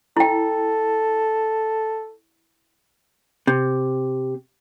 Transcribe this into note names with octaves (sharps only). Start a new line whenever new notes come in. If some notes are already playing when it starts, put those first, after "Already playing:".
E4 A4 G5
C3